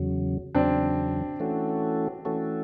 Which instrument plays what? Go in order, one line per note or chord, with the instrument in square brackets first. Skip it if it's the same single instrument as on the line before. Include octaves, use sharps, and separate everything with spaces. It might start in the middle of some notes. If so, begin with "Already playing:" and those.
Already playing: [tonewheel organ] E2 C#3 F#3
[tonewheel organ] E2 C#3 F#3 [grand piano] C4 D4
[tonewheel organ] E3 A3 C#4 F#4 A4
E3 A3 C#4 F#4 A4